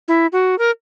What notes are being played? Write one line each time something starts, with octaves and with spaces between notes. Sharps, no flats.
E4
F#4
A#4